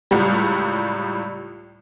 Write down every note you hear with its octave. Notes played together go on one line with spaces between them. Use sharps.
C#2 A2 G3